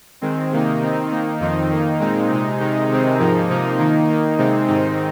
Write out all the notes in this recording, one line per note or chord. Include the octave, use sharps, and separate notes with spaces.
D#3 G#3 C4
C3 D#3 A#3 D#4
D#3 C4 D#4
D#3 A#3 D#4
F2 D#3 C4 D#4
D#3 A#3 D#4
A#2 G#3 C4 D#4
C3 G#3 D#4
C3 D#3 G#3 D#4
C3 D#3 G#3 C4 D#4
G#2 F3 A#3 D#4
C3 F3 A#3 D#4
D#3 A#3 D#4
D#3 A#3 D#4
C3 G#3 C4 D#4
G#2 D#3 C4 D#4